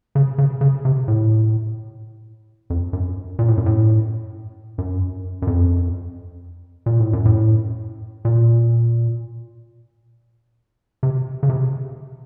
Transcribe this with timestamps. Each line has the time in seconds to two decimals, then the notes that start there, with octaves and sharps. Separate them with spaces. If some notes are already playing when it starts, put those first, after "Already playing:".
0.15 C#3
0.38 C#3
0.61 C#3
0.85 C3
1.08 A2
2.70 F2
2.93 F#2
3.39 A#2
3.48 A2
3.57 F#2
3.66 A2
4.78 F#2
5.42 F#2
5.47 F2
6.86 A#2
7.00 A2
7.13 F#2
7.25 A2
8.25 A#2
11.03 C3
11.43 C#3
11.49 C3